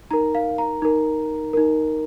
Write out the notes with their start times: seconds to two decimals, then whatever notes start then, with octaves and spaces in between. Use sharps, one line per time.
0.11 D#4 A#4 A#5
0.35 F5
0.58 A#5
0.82 D#4 A#4
1.53 D#4 A#4